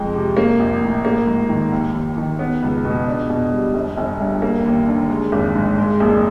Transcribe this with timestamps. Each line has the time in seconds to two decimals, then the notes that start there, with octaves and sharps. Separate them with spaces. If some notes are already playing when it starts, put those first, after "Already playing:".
Already playing: F2 G#3
0.14 C3
0.37 A#3
0.59 A#1
0.82 A2
1.05 A#3
1.27 G#2
1.49 D#3
1.72 D#2
1.94 D#2
2.17 D#3
2.39 B3
2.62 C#2
2.85 B2
3.07 D4
3.30 B2
3.52 G3
3.74 G1
3.98 G1
4.20 G2
4.42 A#3
4.65 D#2
4.87 D3
5.09 G#3
5.32 G#1
5.55 G#2
5.78 G#3
6.00 F#1